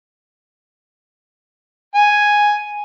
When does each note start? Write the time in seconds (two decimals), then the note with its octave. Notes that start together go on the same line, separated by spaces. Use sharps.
1.95 G#5